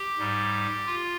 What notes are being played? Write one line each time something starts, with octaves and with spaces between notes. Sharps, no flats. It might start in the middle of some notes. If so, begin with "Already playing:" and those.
Already playing: G4
G#2 G3
F4